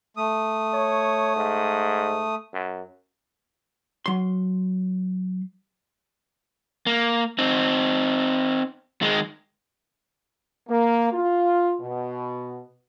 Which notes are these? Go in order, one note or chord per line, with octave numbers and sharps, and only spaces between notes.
A3 D#6
C#5
G#2
F#2
F#3 C6
A#3
C4 D#4
D#3 G#3
A#3
F4
B2